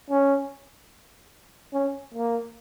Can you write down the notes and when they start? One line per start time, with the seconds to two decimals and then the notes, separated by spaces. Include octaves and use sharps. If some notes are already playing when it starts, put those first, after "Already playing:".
0.10 C#4
1.73 C#4
2.14 A#3